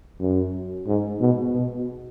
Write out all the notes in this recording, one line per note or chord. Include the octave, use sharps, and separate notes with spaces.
F#2
G#2
B2
B2